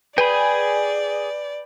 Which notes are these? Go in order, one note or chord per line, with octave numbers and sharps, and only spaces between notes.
G#4 B4 D5 G5 G#5 B5